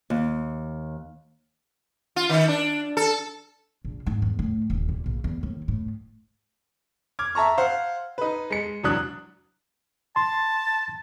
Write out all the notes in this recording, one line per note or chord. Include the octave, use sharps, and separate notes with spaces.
D#2
F4
D#3
D4
A4
A#1
G#2
E2
A2
D#1
A#2
A#1
E2
D#2
A2
D6 F6 G#6
E5 A5 A#5 C#6
C5 F5 F#5
D#4 B4
G#3 C#7
E1 C2 F#3 D4 D#6 F#6
A5 C6